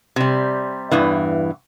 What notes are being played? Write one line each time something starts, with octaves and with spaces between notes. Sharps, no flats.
C3 G3
E2 G2 E3